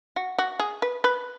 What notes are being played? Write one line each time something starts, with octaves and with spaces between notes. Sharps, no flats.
F#4
F#4
G#4
B4
B4